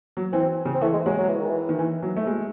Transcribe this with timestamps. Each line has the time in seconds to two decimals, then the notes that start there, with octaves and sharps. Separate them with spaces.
0.17 F#3
0.33 E3 C4
0.65 C#3
0.74 C4
0.81 E3 A3
0.93 G#3
1.05 F#3 G#3
1.18 F#3
1.29 E3
1.39 D#3
1.50 E3
1.69 D#3
1.79 E3
2.02 F#3
2.16 A3
2.27 G#3